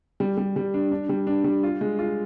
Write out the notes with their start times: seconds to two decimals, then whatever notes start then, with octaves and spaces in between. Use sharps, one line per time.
0.20 G3
0.38 G3
0.56 G3
0.74 D4
0.91 D4
1.09 G3
1.27 D4
1.44 G3
1.63 F4
1.81 G#3
1.99 F4